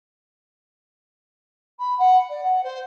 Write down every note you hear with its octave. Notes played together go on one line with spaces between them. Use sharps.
B5
F#5
D5
F#5
C5